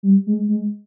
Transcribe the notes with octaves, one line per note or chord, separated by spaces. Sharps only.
G3
G#3
G#3